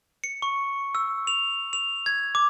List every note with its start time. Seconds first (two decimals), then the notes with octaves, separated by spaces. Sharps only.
0.24 C#7
0.42 C#6
0.95 E6
1.27 F7
1.73 F7
2.06 G#6
2.35 D6